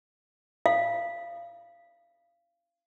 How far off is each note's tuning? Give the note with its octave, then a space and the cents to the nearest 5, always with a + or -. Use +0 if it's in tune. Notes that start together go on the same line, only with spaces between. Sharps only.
F5 -25